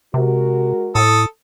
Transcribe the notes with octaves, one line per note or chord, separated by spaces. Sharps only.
C3 G#3 F#4 A#4
A2 A4 D#6